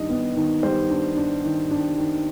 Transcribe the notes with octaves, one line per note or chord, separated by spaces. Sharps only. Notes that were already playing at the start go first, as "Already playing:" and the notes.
Already playing: D#3 G3 D4 D#5
B3
D#3
G3 C5
D4
D4
D#3
D4
D#3